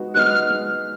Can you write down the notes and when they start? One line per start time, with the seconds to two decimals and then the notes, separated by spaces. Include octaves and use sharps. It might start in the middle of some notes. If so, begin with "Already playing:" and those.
Already playing: G#3 B3 D#4 F#4
0.15 G#3 B3 D#4 F#4 F6 F#6
0.51 G#3